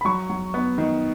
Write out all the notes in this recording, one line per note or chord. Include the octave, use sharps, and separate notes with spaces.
B5
F#3 C#6
F#3
B3
D#3